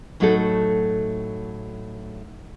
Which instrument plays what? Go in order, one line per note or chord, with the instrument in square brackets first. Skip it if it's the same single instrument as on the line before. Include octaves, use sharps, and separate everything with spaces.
[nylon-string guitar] A2 F#3 A3 D#4 F#4 A4